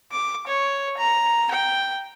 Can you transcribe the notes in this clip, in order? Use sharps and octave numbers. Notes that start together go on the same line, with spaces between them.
D6
C#5
A#5
G5